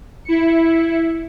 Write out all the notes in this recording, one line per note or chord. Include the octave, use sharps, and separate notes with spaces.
E4 C#7